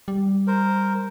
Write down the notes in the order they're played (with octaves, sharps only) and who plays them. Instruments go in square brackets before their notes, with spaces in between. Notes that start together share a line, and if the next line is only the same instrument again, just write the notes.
[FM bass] G3
[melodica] A#4 C5